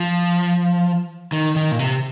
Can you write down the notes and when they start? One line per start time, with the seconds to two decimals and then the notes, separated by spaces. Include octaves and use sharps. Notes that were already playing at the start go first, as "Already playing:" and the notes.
Already playing: F3
1.32 D#3
1.56 D#3
1.72 A#2
1.79 C3